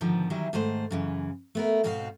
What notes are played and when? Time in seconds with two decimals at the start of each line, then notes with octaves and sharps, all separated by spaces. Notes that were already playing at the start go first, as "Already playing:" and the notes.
0.01 G#2 D3 D#3 F3 B3
0.30 D#3 E3 F#3 G3 E4
0.53 G#2 D#3 A3 C5
0.91 F#2 C#3 E3
1.55 A3 B3 A#4
1.84 G#2 B2 C4 F#4 A#4 F5